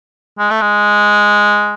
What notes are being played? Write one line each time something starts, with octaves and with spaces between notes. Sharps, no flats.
G#3
A3
G#3